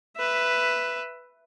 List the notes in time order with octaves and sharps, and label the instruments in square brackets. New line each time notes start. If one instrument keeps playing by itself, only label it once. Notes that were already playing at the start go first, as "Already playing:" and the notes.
[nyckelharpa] B4 E5